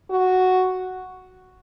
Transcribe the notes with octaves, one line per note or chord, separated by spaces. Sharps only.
F#4